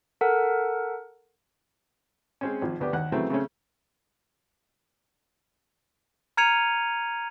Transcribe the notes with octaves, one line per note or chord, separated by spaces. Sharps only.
A4 A#4 F#5
G#3 C4 C#4
G#1 F3
D2 B3 D4 G4
D#2 F#5 F#6
C#3 E3 F#3 A3 C4
C#3 A3 C4 C#4
A#5 F6 G#6 C#7 D#7 F7